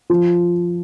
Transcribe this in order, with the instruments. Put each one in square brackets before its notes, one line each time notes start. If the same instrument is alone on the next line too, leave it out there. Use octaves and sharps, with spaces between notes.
[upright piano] F3